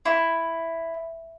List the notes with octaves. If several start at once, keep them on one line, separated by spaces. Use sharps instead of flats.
E4